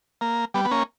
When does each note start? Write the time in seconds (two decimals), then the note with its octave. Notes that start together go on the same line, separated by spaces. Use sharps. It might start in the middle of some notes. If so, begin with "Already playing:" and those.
0.21 A#3
0.54 G3 B3
0.65 B3
0.71 A#3 C#4